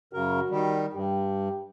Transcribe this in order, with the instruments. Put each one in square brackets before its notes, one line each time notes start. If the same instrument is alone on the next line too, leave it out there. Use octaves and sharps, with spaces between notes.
[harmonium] F#2 C#3 A#4 [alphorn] F#4
[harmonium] D#3 G3
[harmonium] G2 [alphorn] G4